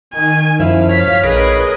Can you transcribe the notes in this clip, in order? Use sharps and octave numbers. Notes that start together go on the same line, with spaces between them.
D#3 G#5
F#2 F3 E4 F5
C#5 F5 B6
A#1 G#4 A#4 B4 D#5